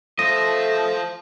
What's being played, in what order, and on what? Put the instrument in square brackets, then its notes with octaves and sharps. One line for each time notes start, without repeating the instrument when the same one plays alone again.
[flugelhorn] A3 [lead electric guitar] F4 C5 [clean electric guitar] D#5